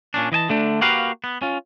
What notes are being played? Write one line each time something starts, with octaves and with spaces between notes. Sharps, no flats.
A#2 C#4 D4
E3 D#5 G#5 A5
D3 A3 D4
A#3 F#4 G4 A#4 B4 F5
B3
C#4 F4